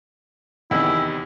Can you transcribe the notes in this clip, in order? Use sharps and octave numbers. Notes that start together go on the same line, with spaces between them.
E2 C3 D#3 E4